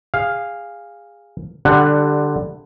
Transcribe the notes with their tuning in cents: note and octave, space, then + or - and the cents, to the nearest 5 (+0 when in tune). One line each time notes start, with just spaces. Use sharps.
G#4 -25 F5 +0
D3 +15 G3 +0 F#5 +0